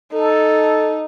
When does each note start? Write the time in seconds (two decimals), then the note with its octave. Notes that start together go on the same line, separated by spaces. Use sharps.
0.13 D#4 A4